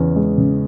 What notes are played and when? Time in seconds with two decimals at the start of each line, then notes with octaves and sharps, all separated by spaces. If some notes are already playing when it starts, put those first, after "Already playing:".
Already playing: E2 C#3 C#4
0.16 G#3
0.38 C#3